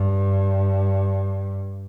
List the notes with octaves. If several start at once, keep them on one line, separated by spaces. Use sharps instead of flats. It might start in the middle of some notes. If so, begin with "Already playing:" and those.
Already playing: G2